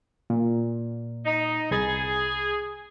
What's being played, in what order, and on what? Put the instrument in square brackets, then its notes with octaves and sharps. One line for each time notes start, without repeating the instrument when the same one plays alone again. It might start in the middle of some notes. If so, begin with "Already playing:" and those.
[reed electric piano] A#2
[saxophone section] D#4
[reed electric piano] C2 B5 A6 [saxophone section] G#4